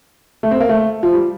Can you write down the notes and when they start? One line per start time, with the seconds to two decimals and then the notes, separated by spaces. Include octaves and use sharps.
0.43 A3
0.51 C4
0.60 A#3
0.69 A3
1.03 F3
1.13 G3